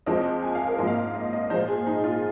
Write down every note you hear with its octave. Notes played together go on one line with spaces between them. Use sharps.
F2 F3 G#3 C4 D#5
G#5
F5
A#4
G#2 F3 A#3 D#5
F5
D#5
D#5
A#2 F3 G#3 C5
G#4
D#4
F4